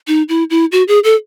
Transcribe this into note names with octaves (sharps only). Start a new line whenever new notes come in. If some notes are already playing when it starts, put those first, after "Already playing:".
D#4
E4
E4
F#4
G#4
A4